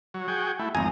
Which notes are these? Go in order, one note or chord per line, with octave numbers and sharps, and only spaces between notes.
F#3
F#4 G#4 G5
A3 E4
G#1 F2 G#5 A#5 D#6